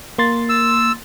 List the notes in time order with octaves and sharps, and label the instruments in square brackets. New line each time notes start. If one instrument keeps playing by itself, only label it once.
[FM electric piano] A#3 C6 A6
[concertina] E6